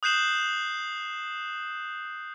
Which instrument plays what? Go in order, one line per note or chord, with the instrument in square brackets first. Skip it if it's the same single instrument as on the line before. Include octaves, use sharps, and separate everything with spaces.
[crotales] D#6 F#6 G6 C7 E7 F#7